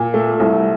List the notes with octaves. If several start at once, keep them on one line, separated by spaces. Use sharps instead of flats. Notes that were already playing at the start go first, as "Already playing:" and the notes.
Already playing: A#2
A3
C2